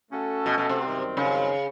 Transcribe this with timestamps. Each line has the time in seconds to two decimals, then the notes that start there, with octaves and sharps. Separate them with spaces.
0.11 A3 C#4 F#4 A4
0.46 B2
0.58 B2
0.69 C3
0.81 F#2 D#3 G3 C4
1.17 C#3